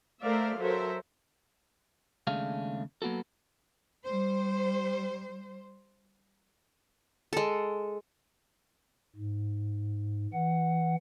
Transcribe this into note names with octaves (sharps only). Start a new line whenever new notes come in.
A3 A#4 C5 D5 E5 F5
F#3 A4 A#4 C5 E5
D#2 C#3 G#3 A3 D4 F5
F#3 A#3 B3 F#4 A4
G3 C5
G#3 A4
G#2
E3 F#5